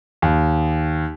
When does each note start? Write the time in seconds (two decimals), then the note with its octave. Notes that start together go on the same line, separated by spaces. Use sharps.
0.22 D#2